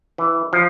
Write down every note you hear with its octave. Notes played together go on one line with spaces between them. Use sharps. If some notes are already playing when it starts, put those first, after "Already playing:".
E3
F3